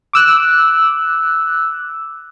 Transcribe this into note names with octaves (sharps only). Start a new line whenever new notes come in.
D6 E6 F#6